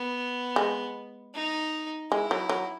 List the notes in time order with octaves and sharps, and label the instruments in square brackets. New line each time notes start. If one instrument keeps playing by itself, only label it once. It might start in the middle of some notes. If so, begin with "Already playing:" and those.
Already playing: [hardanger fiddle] B3
[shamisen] G#3
[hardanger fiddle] D#4
[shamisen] G#3 [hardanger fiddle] E4
[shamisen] F#3
F#3